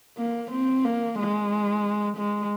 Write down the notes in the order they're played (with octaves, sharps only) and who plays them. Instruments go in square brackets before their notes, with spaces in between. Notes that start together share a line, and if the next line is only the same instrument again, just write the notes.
[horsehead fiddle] A#3
C4
A#3
G#3
G#3